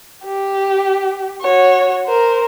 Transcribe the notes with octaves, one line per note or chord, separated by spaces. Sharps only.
G4
F#4 C#5
A#4 C5